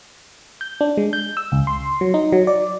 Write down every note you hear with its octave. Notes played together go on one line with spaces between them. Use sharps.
G6
D4
G#3
G6
E6
C#2
C6
F#3
D#4
F#3
D5